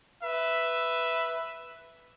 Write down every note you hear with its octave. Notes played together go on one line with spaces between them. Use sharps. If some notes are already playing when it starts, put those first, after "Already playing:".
B4 E5